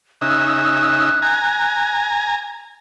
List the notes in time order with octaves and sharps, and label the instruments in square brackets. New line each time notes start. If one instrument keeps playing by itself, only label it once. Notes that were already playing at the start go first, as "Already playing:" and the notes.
[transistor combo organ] C#3 D#4 E5 [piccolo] F#6
[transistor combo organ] G#5 A#5